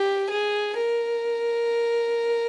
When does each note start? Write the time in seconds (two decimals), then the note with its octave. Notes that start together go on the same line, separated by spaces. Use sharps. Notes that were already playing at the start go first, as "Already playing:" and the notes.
Already playing: G4
0.30 G#4
0.77 A#4